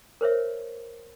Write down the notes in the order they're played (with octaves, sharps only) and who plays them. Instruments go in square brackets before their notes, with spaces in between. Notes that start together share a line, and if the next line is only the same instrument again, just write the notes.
[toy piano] A#4 C5 C#5 E5